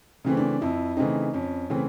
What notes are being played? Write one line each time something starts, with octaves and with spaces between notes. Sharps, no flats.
C#3 E3 A3 C4
D4
F2 E4
C#3 E3 A3 C4 D#4
F2 C#4
C#3 E3 A3 C4